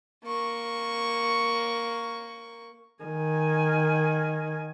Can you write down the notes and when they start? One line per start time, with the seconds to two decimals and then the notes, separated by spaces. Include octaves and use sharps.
0.24 A#3 C#6
3.04 D#3 G#5